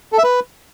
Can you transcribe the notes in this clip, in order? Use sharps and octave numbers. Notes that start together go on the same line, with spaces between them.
A4
E5
B4